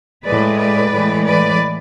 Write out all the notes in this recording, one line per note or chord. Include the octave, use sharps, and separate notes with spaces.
A2 G#3 B4 D5
B4 D5
A2 E3 G#3
B4 D5